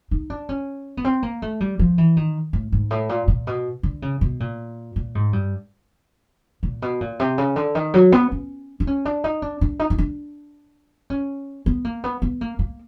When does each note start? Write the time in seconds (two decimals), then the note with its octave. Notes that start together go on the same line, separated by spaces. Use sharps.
0.11 D#4
0.30 D4
0.49 C#4
0.97 B3
1.05 C4
1.23 A#3
1.42 A3
1.60 G3
1.79 F3
1.98 E3
2.17 D#3
2.53 A2
2.72 G#2
2.91 A2
3.09 A#2
3.28 A#2
3.47 B2
3.83 D3
4.02 C#3
4.21 B2
4.40 A#2
4.96 A#2
5.15 G#2
5.33 G2
6.63 A#2
6.82 B2
7.01 A#2
7.20 C3
7.38 C#3
7.56 D3
7.75 D#3
7.94 F#3
8.12 B3
8.32 C#4
8.80 D4
8.87 C#4
9.05 D4
9.24 D#4
9.42 D4
9.61 D4
9.79 D#4
9.90 D#4
9.98 D4
11.10 C#4
11.66 B3
11.85 A#3
12.04 B3
12.22 B3
12.41 A#3
12.59 A#3